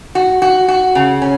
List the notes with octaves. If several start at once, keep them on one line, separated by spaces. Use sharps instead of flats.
F#4
F#4
F#4
C#3
C#4